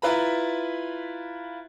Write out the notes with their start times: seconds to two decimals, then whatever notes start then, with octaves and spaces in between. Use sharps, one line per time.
0.02 E4 F4 B4 A#5 B5